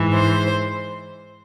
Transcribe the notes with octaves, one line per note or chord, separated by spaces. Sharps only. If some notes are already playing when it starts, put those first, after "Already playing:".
Already playing: G#2 E3
C5